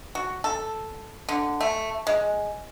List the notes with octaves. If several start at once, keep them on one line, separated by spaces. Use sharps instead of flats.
F#4
A4
D3
A3
G#3